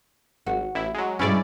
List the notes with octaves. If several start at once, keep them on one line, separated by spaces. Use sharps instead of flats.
G#1 F#4
A1 E4
F#3 G#3
G2 B2 G#3 C#4 E4 D5